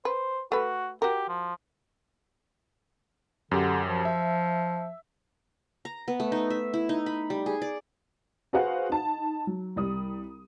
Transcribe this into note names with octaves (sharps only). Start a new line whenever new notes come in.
B4 C5
A3 F#4 B4
F#4 G4 A#4
F3
F#2 D3 G4
F3
E5
A#5
B3
A3
D#4
E5
E4
D#4
B5
G3
G#4
D5
F#4 G#4 B4 C5 F5 F#5
D#4 A5
F#3
C2 G3 D#6